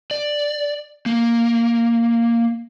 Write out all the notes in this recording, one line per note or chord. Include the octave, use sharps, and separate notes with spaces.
D5
A#3